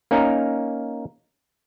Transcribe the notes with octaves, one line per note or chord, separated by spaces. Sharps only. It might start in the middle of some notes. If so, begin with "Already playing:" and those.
A#3 C#4 D#4 A#4